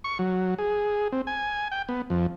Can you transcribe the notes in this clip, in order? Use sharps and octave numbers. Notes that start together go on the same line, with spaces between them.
C#6
F#3
G#4
C4
G#5
G5
B3
F2